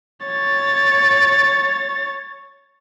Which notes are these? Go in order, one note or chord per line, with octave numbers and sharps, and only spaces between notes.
C#5 A6